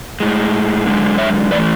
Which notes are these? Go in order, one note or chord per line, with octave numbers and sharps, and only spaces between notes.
A2 G#3
F#2 D3 G#3
C#5 E5
E3 A3 B4 D5